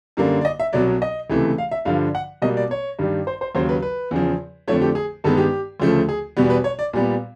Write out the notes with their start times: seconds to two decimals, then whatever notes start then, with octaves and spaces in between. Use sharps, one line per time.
0.17 F#2 D3 G3 A#3
0.41 D5
0.45 D#5
0.60 E5
0.73 C2 B2 F#3 D5
1.02 D#5
1.30 C#2 C3 E3 A3
1.58 F5
1.71 E5
1.85 G2 D3 F3 F5
2.15 F#5
2.42 B2 G3 A#3 D#5
2.57 D5
2.71 C#5
2.99 G2 D#3 G3
3.27 C5
3.41 C5
3.55 D#2 C#3 F#3 C5
3.69 B4
3.82 B4
4.11 E2 C#3 F3
4.68 F2 D3 F3 A3 C#5
4.81 G4
4.95 G#4
5.24 G2 D#3 G#3 B3 A4
5.37 G4
5.80 D2 C#3 F3 A3
6.09 G#4
6.37 E2 B2 G3 B3
6.50 B4
6.64 C#5
6.79 D5
6.93 A#2 G3 B3